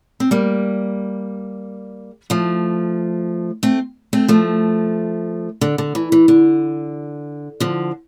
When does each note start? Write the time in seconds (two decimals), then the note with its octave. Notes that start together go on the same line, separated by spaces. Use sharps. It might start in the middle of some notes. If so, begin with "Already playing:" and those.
0.20 C4
0.31 G3 A#3
2.30 F3 A3
3.63 A3 C4
4.13 A3 C4
4.28 F3 A3
5.61 D3
5.78 D3
5.95 E3
6.12 E3
6.28 D3
7.60 D3 F3